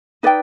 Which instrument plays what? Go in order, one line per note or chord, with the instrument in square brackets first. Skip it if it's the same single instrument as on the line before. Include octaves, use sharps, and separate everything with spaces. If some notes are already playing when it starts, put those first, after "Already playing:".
[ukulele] D#4 B4 D5 G5